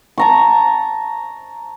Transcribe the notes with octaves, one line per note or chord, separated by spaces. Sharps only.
A5 A#5 C#6